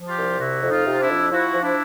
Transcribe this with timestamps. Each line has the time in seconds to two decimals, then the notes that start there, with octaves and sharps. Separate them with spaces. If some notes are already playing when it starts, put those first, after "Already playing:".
Already playing: F3
0.09 F4 G4
0.17 C2
0.39 C3 E4 F#4
0.63 F2
0.70 D#4 F4
0.85 C3
1.01 D4 E4
1.09 F2
1.32 F3 E4 F#4
1.54 F3
1.62 D4 E4